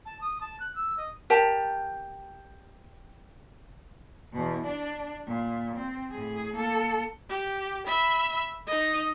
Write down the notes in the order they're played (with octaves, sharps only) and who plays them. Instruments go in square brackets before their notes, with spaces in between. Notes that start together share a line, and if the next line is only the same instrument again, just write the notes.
[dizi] A5
D#6
A5
F#6
E6
D#5
[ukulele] G4 A#4 G5 A5
[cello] E2 B2
D4 D5
A#2
C4
A2 G#4
A#3 A4
[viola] G4
E5 B5
D#4 D#5